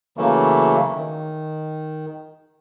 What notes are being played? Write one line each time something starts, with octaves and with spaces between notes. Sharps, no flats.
C#3 E3 F#3 A3 A#3
D#3